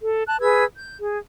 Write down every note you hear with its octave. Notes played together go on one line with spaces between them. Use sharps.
A4
A5 F#6
G#4 B4 E6 G#6
G6
G#4